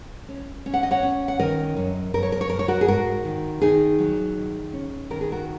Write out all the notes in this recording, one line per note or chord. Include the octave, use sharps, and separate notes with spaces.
C#4
C#4
F#5
D#5
C#5 F#5
C#4
F#5
D#3 A#4 D#5
F#2
F#2 A#4
C#5
A#4
C#5
F#2 A#4
C#5
F#4 A#4
G#4
G#2 F#4 A#4
D#3
D#3 D#4 G#4
F#3
D#3
C#4
D#3 A#4
G#4
F#4 A#4